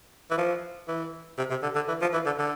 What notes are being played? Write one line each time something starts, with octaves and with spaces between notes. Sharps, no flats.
E3
F3
E3
C3
C3
D3
D3
E3
F3
E3
D3
D3